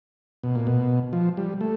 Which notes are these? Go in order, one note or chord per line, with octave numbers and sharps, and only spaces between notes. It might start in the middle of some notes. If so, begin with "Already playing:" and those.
B2
A#2
B2
F3
G3
A3